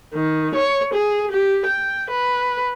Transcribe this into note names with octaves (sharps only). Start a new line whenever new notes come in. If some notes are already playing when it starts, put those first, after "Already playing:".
D#3
C#5
G#4
G4
G5
B4